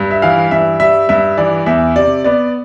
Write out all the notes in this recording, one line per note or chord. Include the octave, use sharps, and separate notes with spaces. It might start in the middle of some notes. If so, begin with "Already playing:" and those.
Already playing: G2
E5
E3 F5
G2 E5
G3 E5
G2 E5
E3 D5
E2 E5
C3 D5
B3 D5